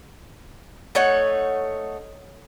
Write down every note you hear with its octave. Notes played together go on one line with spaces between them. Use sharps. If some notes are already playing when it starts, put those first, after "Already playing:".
A3 D#4 C#5 F#5